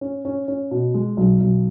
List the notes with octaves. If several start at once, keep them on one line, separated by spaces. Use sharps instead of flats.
C#4
C#4
C#4
B2
G#3
B1
B1